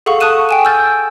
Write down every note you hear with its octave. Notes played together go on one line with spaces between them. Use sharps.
G#4 A4 F5 F#5 C#6
A5 C#6 D#6 F#6 D#7 E7
G5 G#5 E7
E6 F6 G6 A6